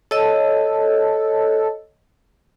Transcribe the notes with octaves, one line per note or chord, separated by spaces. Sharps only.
A4 C#5 D#5